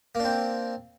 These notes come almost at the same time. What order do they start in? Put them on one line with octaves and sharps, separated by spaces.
A#3 D4 C4